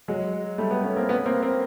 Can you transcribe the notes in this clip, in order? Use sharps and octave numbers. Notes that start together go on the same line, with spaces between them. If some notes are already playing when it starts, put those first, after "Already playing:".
F#3 G#3
G3 A3
A3 B3
B3 C#4
A#3 C4
B3 C#4
A#3 C4
A#3 C4